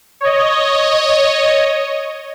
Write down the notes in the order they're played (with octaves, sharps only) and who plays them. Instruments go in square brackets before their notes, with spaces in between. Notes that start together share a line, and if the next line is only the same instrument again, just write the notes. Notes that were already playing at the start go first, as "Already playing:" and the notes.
[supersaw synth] C#5 D#5